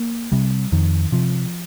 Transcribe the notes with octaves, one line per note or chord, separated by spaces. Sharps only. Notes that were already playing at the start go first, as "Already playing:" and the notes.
Already playing: A#3
C3 G3
F2 D#3
C3 F3